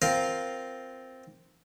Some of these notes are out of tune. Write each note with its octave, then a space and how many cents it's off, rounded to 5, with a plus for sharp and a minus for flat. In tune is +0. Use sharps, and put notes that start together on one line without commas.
C4 -5 F4 +0 A#4 +0